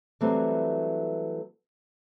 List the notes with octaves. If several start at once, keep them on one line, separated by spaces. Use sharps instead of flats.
E3 F#3 G3 A3 C4